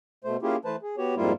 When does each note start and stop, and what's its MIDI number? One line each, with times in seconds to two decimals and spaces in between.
0.24 0.37 47
0.24 0.37 57
0.24 0.37 72
0.42 0.56 58
0.42 0.56 61
0.42 0.56 64
0.42 0.56 65
0.42 0.56 67
0.42 0.56 68
0.65 0.76 52
0.65 0.76 57
0.65 0.76 71
0.65 0.76 72
0.65 0.76 81
0.82 0.96 68
0.98 1.15 59
0.98 1.15 66
0.98 1.15 67
0.98 1.15 73
1.16 1.32 41
1.16 1.32 44
1.16 1.32 55
1.16 1.32 58
1.16 1.32 64
1.16 1.32 65